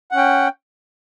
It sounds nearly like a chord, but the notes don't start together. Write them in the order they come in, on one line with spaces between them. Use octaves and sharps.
F#5 C#4 G5